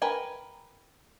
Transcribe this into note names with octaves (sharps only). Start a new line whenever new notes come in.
A#4 B4 G5 G#5